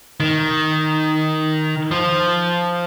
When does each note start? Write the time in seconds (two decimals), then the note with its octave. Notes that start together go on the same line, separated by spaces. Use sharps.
0.20 D#3
1.91 F3